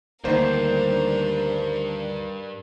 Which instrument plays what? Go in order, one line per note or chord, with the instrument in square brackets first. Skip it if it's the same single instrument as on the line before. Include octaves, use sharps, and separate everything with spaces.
[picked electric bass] D2 D#3 [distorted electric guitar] G2 [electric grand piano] A#3 C5 [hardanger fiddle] A#4